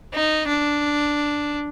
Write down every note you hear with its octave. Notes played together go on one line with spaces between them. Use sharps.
D#4
D4